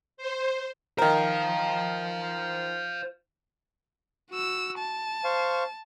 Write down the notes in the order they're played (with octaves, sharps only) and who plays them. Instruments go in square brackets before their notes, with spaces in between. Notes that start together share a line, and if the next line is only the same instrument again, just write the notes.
[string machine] C5
[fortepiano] D#3 A#4 [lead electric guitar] C5 F5
[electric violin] F#4 E6
A5
[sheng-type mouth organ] C5 F5 C#6